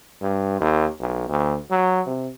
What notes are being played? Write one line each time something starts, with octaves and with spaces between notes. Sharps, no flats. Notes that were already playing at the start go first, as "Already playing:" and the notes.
G2
D#2
B1
D2
F#3
C3